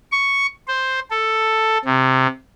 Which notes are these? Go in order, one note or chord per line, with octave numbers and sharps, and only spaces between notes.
C#6
C5
A4
C3